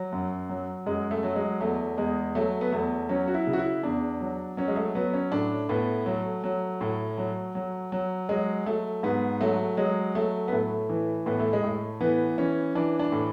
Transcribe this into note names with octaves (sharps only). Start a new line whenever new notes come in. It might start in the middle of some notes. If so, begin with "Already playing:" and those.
Already playing: F#3
F#2
F#3
F#2 G#3
A3
F#3
G#3
E2 A3
E2 G#3
F#3 A3
B3
E2 A3
F#3 C#4
F#4
E4
C#3
F#4
E4
E2 D4
F#3
F#3 C#4
G#3
A3
F#3 B3
C#4
A2 D4
A2 B3
F#3 A3
F#3
A2
F#3
F#3
F#3
F#3 G#3
F#3 A3
G#2 B3
F#3 A3
F#3 G#3
F#3 A3
B3
A2 A3
E3
A2 B3
A3
G#3
A2 A3
E3 B3
E3 C#4
E3 D4
D4
A2